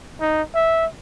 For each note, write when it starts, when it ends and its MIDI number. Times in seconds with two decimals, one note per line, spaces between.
0.20 0.42 63
0.54 0.86 76